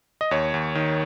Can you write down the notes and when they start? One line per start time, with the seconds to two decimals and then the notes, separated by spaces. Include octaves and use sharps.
0.21 D#5
0.31 D#2 C#5
0.54 D#2
0.75 D#3